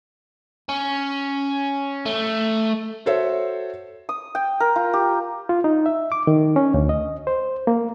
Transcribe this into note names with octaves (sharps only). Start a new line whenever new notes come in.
C#4
A3
F#4 A4 C5 C#5 E5
D#6
G5
A#4
F4
G4
F4
D#4
E5
D6
D#3
C#4
D2
D#5
C5
A#3